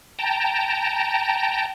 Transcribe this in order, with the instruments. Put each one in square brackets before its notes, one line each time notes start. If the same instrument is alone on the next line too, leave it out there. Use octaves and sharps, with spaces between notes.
[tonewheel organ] G5 A5 A#5